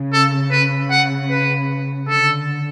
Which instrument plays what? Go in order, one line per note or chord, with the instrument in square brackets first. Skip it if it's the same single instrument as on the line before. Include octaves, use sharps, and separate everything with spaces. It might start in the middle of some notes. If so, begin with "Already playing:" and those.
Already playing: [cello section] C#3
[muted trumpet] A4
B4
F#5
B4
[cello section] D3 [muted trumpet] A4